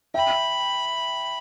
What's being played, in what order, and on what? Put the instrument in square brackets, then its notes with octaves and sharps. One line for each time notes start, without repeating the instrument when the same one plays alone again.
[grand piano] E5 G5 [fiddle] B5